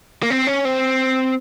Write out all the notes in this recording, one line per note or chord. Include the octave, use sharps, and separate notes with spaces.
A#3
C4
C#4
C4